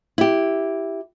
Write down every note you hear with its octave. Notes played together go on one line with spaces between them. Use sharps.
E4 G4